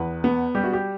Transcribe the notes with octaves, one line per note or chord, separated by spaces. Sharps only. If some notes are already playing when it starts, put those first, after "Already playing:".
Already playing: E2 B4
B3
G3 G4
F#4
G4